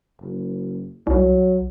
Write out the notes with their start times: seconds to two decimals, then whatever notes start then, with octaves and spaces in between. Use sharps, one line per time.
0.22 F#1
1.07 C2 F#3